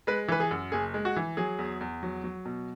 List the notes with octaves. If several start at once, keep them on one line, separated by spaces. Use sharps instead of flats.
G#3 B4
E3 B4
G#4
F#2
F#1 G#4
G#3
F#4
E3
F#3 G#4
E2
E2
F#3
F#3
B2